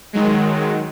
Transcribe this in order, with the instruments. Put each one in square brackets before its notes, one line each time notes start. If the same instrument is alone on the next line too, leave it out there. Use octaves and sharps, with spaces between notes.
[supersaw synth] D#3 F#3 G#3